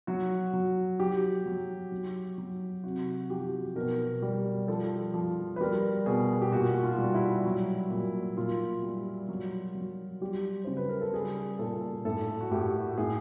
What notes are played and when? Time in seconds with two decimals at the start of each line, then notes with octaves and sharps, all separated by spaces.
0.07 F#3 F#4
0.53 F#3
1.00 F#3 G4
1.46 F#3
1.92 F#3
2.38 F#3
2.84 C3 F#4
3.30 F3 G4
3.76 B2 A#4
4.22 G3
4.68 F3 A4
5.14 F3
5.56 B4
5.61 G3 A#4
6.06 B2 G#4
6.42 G4
6.52 A#2 F#4
6.83 F4
6.98 G3
7.14 E4
7.45 F#3
7.90 A#2
8.37 A#2 F4
8.83 G3
9.29 F#3
9.75 F#3
10.21 G3 G4
10.65 C#3 C5
10.77 B4
10.89 A#4
11.01 A4
11.13 G3 G#4
11.59 A#2 A4
12.05 A2 A4
12.41 F#4
12.51 A2 G4
12.98 A2 G#4